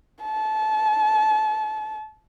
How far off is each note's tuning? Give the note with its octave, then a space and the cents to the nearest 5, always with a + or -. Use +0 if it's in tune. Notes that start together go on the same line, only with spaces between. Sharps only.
A5 -25